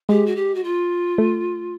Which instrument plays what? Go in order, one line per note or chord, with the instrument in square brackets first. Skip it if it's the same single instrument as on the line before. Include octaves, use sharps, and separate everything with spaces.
[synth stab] G#3 [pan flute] G4
[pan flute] F#4
G4
F#4
F4
[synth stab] A3